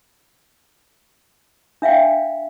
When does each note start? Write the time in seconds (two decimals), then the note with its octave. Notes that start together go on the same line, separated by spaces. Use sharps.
1.82 D4 E5 F5 G5